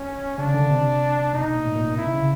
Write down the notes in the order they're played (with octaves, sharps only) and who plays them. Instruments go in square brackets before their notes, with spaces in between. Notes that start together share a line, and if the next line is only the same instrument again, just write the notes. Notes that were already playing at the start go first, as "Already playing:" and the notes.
Already playing: [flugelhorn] C#4
[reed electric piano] C#3 [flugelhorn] D4
[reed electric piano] D3
C3
[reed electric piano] B2 [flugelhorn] D#4
[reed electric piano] B2
A#2
A2
A#2
B2
[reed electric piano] C3 [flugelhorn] E4
[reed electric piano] C#3